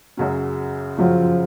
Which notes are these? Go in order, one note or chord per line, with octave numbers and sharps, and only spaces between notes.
F#2 C#3 F#3
F#2 C#3 F3 F#3